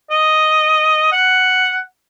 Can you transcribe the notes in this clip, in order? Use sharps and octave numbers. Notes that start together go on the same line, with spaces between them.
D#5
F#5